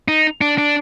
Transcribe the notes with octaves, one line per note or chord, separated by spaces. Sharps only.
D#4
D4
D4